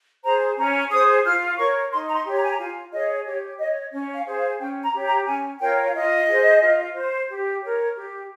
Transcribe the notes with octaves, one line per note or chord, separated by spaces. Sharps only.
G#4 C5 A#5
C#4 A#5
G#4 C5 D#6
F4 F6
A#4 C#5 C#6
D#4 C6
A#5
C6
G4 C#5
A#5
G#5
A#5
F4 G#5
G#4 C#5 D#5
G4 C#5
C#5 D#5
C#4 C#5
F5
G#4 C5
F5
C#4 G5
A#5
G4 C#5
A#5
C#4 G#5
F4 A#4 C#5 G5
F5
F4 D#5
G#4 C5
F4
C5
G4
A#4 C#5
G4